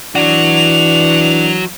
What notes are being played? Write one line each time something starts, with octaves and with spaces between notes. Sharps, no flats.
E3 F#3 D4 F#4 F7